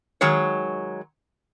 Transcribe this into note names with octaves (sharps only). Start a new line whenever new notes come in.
D#3 F#3 G#3 C#5